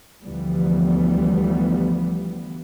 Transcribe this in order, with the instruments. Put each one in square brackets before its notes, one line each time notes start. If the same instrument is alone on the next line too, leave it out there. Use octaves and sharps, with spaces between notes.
[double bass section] D2 E3 F3 G3 B3